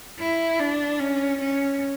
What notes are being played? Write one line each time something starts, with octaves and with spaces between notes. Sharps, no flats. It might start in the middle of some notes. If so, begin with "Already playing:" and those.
E4
D4
C#4
C#4